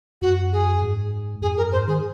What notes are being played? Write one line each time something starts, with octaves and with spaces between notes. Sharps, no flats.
F#2 F#4
G#4
G#2
F2 G#4
F#2 A#4
G#2 C5
D#3 G#4